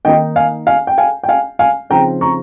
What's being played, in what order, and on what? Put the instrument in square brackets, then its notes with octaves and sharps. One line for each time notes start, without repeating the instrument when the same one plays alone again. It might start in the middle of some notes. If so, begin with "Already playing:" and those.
[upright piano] D#3 A#3 D#4 D#5 G5
F5 G#5
F5 G#5
G5
F5 G#5
G5
F5 G#5
F5 G#5
C#3 F3 C4 D#4 G5 A#5
A#5 C#6